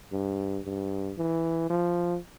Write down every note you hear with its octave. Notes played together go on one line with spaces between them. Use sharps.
G2
G2
E3
F3